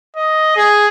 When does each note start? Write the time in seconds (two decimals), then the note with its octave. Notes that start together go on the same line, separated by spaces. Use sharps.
0.16 D#5
0.56 G#4